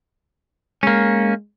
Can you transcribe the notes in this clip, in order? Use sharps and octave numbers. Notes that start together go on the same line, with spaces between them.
G#3 A#3 C#4